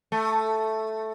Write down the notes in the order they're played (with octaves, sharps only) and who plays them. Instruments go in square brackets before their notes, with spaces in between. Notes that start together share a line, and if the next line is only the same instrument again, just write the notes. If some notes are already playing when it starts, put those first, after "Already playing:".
[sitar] A3